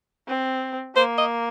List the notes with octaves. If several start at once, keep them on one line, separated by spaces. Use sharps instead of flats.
C4
A#3 C5
D#5